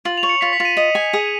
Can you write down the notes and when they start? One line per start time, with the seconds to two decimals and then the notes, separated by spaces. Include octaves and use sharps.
0.05 F4 F#7
0.18 F7
0.23 C#5
0.29 C#7
0.41 F4 B6
0.53 B6
0.60 F4
0.65 D#7
0.77 D#5
0.95 G#5
1.13 G#4